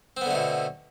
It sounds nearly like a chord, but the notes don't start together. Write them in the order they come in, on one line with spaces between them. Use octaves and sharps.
C4 B3 D3 A3 B2